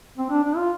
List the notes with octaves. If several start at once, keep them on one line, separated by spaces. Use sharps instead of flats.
C4
D4
D4
F4